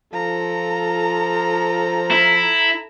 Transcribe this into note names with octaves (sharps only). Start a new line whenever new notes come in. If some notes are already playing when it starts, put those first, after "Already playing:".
F3 A4 A#5
E4